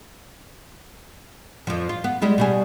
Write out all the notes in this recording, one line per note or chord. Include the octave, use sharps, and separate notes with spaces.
F2 F3
F4
B3
G3 G#3 E4
B2 G3 G#4